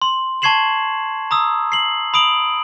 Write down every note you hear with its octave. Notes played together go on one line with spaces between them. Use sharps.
C6
A5 C#6 G#6 C7 E7 F#7
A#5 D#6 E6
C7 F#7
B5 D#6 D7 F#7